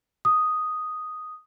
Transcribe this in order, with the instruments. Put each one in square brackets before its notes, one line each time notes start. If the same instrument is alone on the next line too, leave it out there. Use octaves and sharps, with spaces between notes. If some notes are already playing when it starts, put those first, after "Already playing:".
[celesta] D#6